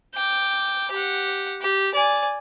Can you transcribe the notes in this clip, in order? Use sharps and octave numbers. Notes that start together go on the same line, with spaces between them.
G5 D6
G4 F#5
G4
D5 G#5